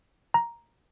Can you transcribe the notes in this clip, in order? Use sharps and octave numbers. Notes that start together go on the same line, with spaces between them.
A#5